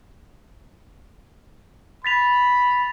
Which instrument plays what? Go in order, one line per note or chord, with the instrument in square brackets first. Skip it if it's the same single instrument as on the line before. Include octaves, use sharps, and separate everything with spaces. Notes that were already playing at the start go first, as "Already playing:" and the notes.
[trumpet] B5 [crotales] A6 B6 F7